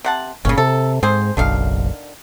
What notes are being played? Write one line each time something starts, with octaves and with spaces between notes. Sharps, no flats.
C3 F#5 A5
G1 A#2 C#3 C#4
C3 A4
G#2 C4 G#4 C5
F#1 B1 D3 D#3 F5